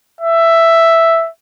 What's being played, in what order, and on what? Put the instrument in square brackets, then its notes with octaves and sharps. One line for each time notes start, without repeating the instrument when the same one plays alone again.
[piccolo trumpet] E5